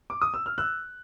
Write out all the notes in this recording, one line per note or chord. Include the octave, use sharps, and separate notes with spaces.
D6
D#6
E6
F6
E6 F#6